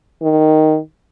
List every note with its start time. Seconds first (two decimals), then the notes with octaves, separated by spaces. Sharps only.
0.22 D#3